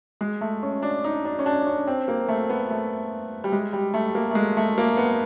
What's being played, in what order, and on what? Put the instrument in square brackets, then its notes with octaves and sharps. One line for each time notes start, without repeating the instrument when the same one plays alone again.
[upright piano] G#3
A3
C#4
D4
D#4
D4
C#4
D4
C#4
C4
A#3
A3
B3
A3
G3
G#3
G3
A3
A#3
A3
G#3
A3
A#3
B3